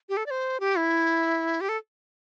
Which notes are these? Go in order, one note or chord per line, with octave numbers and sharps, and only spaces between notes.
G4
A4
D5
C5
G4
E4
G4
A4